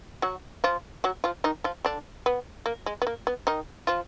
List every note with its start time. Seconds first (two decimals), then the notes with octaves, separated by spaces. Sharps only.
0.22 F#3 F#4
0.64 F3 F4
1.04 F#3 F#4
1.24 F3 F4
1.44 D#3 D#4
1.64 F3 F4
1.85 D3 D4
2.26 B3
2.66 A#3
2.86 G#3
3.02 B3
3.07 A#3
3.27 B3
3.47 D#3 D#4
3.87 F3 F4